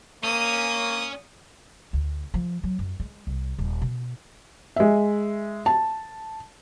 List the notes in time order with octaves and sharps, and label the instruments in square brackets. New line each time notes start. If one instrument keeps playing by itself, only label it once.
[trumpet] A#3 [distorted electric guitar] C#4 [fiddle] D#6
[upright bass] D2
F3
F#3
F#2
G#3
C2
D#1
B2
[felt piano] G#3 E5
A5